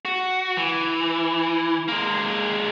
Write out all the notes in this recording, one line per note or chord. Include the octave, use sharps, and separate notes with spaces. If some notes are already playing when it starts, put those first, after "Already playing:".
F#4
E3
G#3 A#3